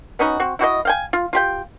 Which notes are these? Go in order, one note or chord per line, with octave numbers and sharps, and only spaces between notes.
B3 C#4 D#4 F#4
C4 F#4
E4 F#4 G4 D#5
F5 G5 G#5
F4
F4 G4 G5